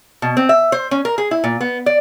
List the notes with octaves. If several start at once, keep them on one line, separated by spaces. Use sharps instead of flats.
B2
C4
E5
C5
C#4
A#4
G#4
E4
A#2
B3
D5